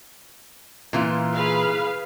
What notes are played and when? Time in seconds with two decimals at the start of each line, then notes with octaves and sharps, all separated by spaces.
0.93 A#2 E3 F4
1.35 G#4 B4 F5